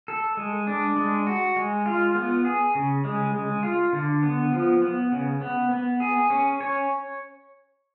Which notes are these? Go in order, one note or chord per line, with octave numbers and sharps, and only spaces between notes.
A4
G#3
D4
G#3
F#4
G#3
F4
B3
G#4
C#3
G#3
G#3
F4
D3
B3
F3
B3
C#3
B3
B3
G#4
C#4
C#5